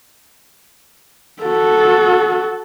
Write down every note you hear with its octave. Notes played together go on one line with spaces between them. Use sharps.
F#4 A4